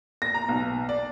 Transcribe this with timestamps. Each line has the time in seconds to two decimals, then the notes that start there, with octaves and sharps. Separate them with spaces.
0.22 A#6
0.34 A#5
0.49 B1
0.89 D5